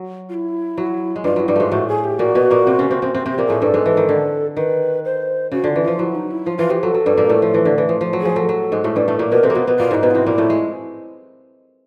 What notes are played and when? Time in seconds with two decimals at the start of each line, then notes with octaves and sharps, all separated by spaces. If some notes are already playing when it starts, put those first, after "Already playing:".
Already playing: F#3
0.29 F4
0.34 E4
0.77 F#3
1.16 G#3
1.24 G2 G3 F4
1.36 F#3 E4
1.48 G2 G3
1.56 G#2 G#3 A3 F4
1.72 A2 A3 F#4
1.88 G#4
2.04 G4
2.19 A#2 A#3 F#4
2.35 B2 B3
2.50 A#2 A#3
2.66 C3 C4
2.79 C#3 C#4
2.90 C3 C4
3.02 C3 C4
3.14 C3 C4
3.26 C3 C4
3.31 G4
3.38 A#2 A#3
3.46 A2 A3 G#4
3.61 G2 G3 A4
3.74 G#2 G#3
3.86 E3
3.97 D#3
4.09 D3
4.57 D#3 B4
5.05 C5
5.52 C#3 F#4
5.64 D3 F4
5.76 E3
5.83 F3 F4
5.99 F#3 E4
6.15 D#4
6.31 E4
6.46 F3 F4
6.58 E3 F4
6.70 F3 G4
6.83 F#3 A4
6.94 F#3
7.06 G2 G3
7.17 A#2 A#3
7.29 A2 A3
7.42 F3
7.54 E3
7.65 D3
7.78 E3
7.89 F3
8.01 F3
8.13 F#3
8.21 F3 G#4
8.36 F#3 A4
8.49 F#3
8.72 G#2 G#3
8.84 A2 A3
8.96 G2 G3
9.08 A2 A3
9.19 A#2 A#3
9.32 B2 B3 A#4
9.43 C3 C4 A4
9.50 A#3
9.55 B2 B3 F4
9.67 B2 B3
9.79 A#2 A#3 F4
9.91 G#2 G#3 D#4
10.03 B2 B3
10.11 F4
10.14 C3 C4 E4
10.26 A#2 A#3
10.38 A2 A3
10.50 G#3